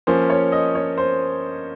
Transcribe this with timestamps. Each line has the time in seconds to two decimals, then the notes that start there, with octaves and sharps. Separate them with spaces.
0.07 F3 A#3 C#4 C5
0.30 C#5
0.52 D#5
0.75 C#5
0.98 C5